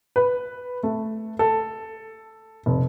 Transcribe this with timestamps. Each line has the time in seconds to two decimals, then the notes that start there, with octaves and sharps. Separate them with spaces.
0.16 B4
0.83 A3
1.39 A4
2.66 F1